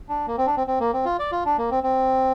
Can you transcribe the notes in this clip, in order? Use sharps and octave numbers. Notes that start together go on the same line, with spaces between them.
D4
A#3
C4
D4
C4
C4
A#3
C4
F4
D5
F4
D4
A#3
C4
C4